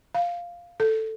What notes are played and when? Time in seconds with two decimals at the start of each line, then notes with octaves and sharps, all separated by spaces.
0.15 F5
0.80 A4